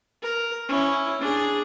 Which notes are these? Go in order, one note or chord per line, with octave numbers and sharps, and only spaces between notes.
A#4
C#4 E4
D4 G#4